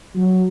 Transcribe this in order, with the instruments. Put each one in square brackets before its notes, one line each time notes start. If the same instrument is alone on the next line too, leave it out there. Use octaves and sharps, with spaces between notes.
[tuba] F#3